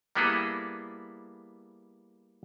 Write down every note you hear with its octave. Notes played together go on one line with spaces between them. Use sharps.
G3 A#3 B3 E4 G#4 A4